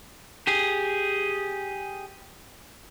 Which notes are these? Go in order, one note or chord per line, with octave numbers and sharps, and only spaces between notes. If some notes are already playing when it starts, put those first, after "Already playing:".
G4 G#4